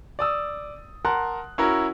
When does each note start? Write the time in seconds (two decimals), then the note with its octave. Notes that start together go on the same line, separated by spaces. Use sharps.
0.19 D5 D#6 E6
1.05 A#4 F#5 A5 C6 F#6
1.58 C#4 E4 F#4 A#4